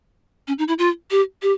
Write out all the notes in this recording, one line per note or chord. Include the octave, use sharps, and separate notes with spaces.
C#4
D#4
E4
F4
G4
G4